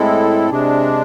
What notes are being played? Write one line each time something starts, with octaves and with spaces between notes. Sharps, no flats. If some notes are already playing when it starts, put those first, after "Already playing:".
Already playing: A2 G#3 C4 E4 A4
C3 G#3 D4